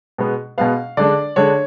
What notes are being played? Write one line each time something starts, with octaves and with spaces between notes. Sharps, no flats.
B2 G#3 B3
B2 G#3 B3 F5
D3 G#3 D4 D5
D3 G#3 D4 C#5